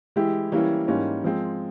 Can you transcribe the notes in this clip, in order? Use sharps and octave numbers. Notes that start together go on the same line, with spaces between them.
E3 G#3 E4 G4
E3 G3 A#3 C#4 E4
G#2 E3 G3 A#3 C#4
F3 G#3 C4